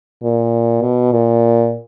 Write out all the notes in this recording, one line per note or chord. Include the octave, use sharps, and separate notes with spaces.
A#2
B2
A#2